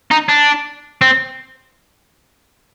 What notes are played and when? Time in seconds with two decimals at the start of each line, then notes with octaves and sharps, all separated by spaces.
0.11 D#4
0.29 D4
1.01 C4